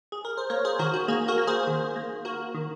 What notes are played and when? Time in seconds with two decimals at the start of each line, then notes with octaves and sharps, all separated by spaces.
0.12 G#4
0.25 A#4
0.37 C5
0.50 A#3 A#4 C#5
0.65 G#4 C5
0.79 D#3 F#4 A#4
0.94 F#4
1.08 A#3 G#4
1.28 F#4 A#4
1.38 A#3
1.47 G#4 C5
1.67 D#3
1.96 A#3
2.25 A#3 F#4 A#4
2.54 D#3